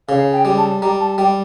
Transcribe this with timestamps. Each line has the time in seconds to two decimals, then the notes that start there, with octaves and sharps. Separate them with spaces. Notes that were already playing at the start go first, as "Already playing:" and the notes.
0.08 C#3 F5
0.33 G5
0.45 G3
0.57 A5
0.82 G3 A#5
1.00 A5
1.18 G3 G5